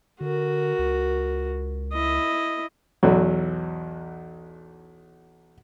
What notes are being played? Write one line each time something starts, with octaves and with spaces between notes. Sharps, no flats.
D3 F#4 A#4
C#2
E4 D#5
B1 E2 F#3